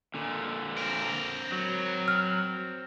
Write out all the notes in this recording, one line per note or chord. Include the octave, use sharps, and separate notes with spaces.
A#2 D3
C4 A#4
F#3
F6